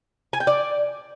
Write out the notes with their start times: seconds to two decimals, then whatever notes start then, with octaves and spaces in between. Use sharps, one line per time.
0.33 G#5
0.40 G5
0.47 D5